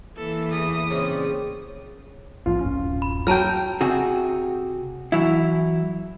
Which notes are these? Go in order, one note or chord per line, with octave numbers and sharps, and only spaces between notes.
E3 A#3 A4
E2 D#6
A#2 C#3 C4 C#5 D5
A#1 G#2 F3 F4
D1 F#2 C#4
B5
F#3 A#4 G5 A5 A#5 F6
C3 F#4 G#4
E3 F#3 E4